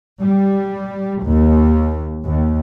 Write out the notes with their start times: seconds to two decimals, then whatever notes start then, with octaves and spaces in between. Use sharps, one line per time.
0.20 G3
1.24 D#2
2.25 D#2